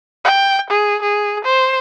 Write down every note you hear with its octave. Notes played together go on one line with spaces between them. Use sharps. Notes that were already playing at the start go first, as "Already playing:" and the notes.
G5
G#4
G#4
C5